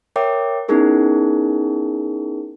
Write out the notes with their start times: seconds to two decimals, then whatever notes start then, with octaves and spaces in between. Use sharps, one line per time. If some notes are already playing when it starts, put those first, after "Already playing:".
0.16 A#4 C#5 E5 G5 D6
0.68 B3 C#4 D#4 E4 G#4 A#4